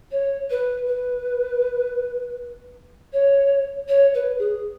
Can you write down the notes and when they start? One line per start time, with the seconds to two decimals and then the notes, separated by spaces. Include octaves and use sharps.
0.11 C#5
0.50 B4
0.87 B4
3.13 C#5
3.88 C#5
4.14 B4
4.39 G#4